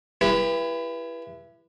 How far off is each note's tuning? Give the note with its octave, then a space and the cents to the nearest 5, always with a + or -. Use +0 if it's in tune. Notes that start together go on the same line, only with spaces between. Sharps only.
E4 +25 G4 +35 B4 -20